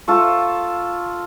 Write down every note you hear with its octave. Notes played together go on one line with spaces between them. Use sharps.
F4 A4 C#6